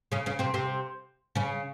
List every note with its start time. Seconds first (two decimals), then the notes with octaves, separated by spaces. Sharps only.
0.12 C#3 C#4
0.26 C#3 C#4
0.39 C3 C4
0.54 C3 C4
1.35 C#3 C#4